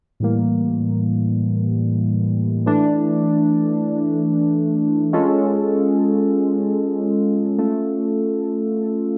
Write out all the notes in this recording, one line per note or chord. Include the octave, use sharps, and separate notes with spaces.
A2 E3 G3 A#3
E3 A3 D4
G#3 C#4 F4 A4
A3 C#4 F4 A4